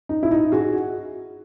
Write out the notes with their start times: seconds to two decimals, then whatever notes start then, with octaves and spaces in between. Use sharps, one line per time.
0.09 D#4
0.23 E4
0.31 D#4
0.52 F#4 G#4